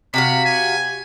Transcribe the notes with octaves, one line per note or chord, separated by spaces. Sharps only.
C3 F#4 F5 B5
G#5